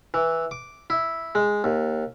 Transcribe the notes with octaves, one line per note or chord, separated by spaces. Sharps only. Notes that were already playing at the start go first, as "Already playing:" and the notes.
E3
D6
E4
G#3
D#2